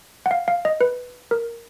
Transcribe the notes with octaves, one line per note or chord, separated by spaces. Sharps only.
F#5
F5
F5
D#5
B4
A#4